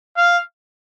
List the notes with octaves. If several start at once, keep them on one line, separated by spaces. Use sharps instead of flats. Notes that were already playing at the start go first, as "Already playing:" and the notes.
F5